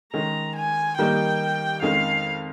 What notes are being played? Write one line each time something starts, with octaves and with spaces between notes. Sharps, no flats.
D#3 G#3 C#4 A#5
G#5
D#3 G3 A#3 D#4 G5
F2 D#3 G#3 C#4 F5